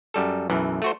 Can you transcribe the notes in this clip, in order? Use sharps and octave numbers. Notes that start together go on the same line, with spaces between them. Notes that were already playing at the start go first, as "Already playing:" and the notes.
F#2 G3 A4
B1 F#2 E3
A3 F#4 C5